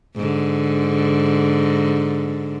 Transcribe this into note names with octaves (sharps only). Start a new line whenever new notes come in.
G#2 D3